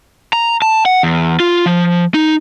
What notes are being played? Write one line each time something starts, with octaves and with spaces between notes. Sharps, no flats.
A#5
A5
F#5
E2
F4
F3
D#4